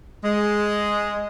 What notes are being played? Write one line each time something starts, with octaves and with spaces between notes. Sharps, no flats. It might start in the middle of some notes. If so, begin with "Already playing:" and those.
G#3